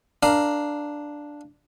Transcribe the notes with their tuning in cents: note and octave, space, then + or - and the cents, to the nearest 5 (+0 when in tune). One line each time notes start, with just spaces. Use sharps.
D4 +0 A#4 +0 F5 -10